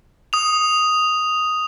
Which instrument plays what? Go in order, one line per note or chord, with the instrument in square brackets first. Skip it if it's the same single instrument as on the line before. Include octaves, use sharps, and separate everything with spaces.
[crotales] D#6 F7